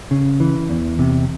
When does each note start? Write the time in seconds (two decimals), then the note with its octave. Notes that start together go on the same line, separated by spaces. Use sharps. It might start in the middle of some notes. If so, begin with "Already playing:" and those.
0.11 C#3
0.40 E3
0.70 E2
0.99 C3